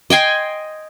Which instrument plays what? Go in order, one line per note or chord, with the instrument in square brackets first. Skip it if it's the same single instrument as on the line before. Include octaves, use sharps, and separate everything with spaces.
[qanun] D#5 G5 G#5 C6